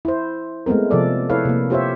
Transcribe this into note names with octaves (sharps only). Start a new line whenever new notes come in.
E4 C5
G#3 A3 B3 C4 A#4
C3 F3 A4 D5
E4 A4 B4 C#5 F5
C3 A#3
F4 G4 C5 C#5 E5